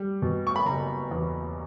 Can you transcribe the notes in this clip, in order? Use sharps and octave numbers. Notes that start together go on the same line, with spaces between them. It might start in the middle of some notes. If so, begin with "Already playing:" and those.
Already playing: G3
B2
C#6
B5
F#1 A#5
E2